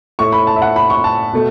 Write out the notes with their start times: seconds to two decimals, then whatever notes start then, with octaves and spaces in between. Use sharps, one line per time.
0.19 A2 A3 C#6
0.33 B5
0.47 A5
0.56 E5
0.62 F#5
0.76 B5
0.90 C#6
1.04 A5
1.33 B2 A3